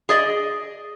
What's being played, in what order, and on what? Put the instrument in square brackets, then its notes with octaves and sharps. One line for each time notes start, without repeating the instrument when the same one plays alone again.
[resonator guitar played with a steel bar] G#4 D5 D#5